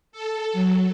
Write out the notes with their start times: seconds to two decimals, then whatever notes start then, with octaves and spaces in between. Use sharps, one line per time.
0.12 A4
0.53 F#3